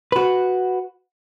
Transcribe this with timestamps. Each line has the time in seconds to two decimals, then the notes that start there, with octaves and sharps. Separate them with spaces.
0.12 F#4 B4